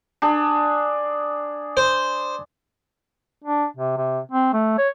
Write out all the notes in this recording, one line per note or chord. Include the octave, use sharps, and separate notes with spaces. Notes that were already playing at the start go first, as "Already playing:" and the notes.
D4 G#4
C5
D4
C3
C3
C4
A3
C#5